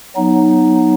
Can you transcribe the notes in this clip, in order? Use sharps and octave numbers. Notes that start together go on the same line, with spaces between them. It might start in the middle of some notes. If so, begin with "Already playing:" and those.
F#3 B3 D#4